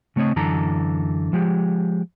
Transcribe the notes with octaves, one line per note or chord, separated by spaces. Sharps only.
C#3 A3 C4 C#5 D#5
F#2 D3 E3 A4 A#5
F3 G#3 G4